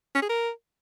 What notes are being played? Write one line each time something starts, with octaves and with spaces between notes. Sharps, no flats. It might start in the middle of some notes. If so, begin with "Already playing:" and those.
C#4
G#4
A#4